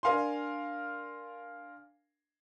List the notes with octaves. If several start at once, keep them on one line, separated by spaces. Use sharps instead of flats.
D4 A#4 F5 G#5 C6